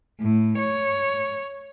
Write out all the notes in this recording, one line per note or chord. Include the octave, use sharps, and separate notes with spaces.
A2
C#5